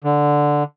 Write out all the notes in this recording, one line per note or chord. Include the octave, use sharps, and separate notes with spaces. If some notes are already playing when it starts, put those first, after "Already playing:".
D3